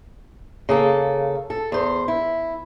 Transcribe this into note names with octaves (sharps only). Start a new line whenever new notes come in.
C#3 A#3 A4
A4
E2 C5
E4